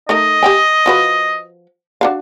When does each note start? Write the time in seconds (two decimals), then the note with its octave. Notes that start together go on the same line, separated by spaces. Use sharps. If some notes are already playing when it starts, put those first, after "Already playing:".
0.09 A3 D#4 A#4 D#5
0.43 G4 G5 G#5
0.86 F3 F#4 B4
2.01 D4 F#4 F5